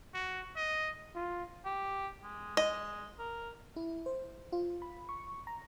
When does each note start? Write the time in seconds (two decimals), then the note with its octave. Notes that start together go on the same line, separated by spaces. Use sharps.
0.14 F#4
0.56 D#5
1.15 F4
1.65 G4
2.23 G#3
2.57 G#3 D#5
3.19 A#4
3.76 E4
4.06 C5
4.52 F4
4.82 B5
5.09 C#6
5.47 A#5